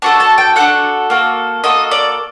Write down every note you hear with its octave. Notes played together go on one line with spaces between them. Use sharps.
D4 F#4 A4 A5
A5
G5
D4 F#4 A4 F#5
A#3 F#4 A4
A#3 F#4 A4 D#5
D5